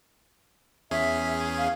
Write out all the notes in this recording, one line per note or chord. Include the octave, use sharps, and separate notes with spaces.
E2 C#4 G#4 E5
F5